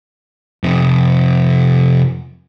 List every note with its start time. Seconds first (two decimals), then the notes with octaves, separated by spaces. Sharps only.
0.64 F2 C3